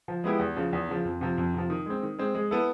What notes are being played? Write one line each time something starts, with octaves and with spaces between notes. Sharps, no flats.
F3
G#3 B3 E4 G4
E2
C#3 F3
E2
C#3 F3
F2
C3 F3
F2
C3 F3
D#3
G#3 C4
D#3
G#3 C4
G#3
B3 E4 A4